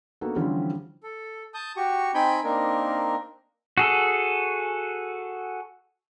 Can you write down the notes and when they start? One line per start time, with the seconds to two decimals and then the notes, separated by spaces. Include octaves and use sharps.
0.21 A#3 B3 D4 D#4 F#4 A4
0.36 D3 E3 F3 G3 C4 C#4
1.03 A4
1.54 A5 D#6 G6
1.77 F#4 G4 C#6
2.14 C4 D#4 G5 G#5 B5 G6
2.44 A#3 C4 D4 D#4 A#4
3.78 F#4 G#4 A4